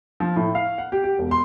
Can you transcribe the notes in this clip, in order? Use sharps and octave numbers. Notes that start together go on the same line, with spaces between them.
F3
A2
F5
F#5
G4
G4
E1
C6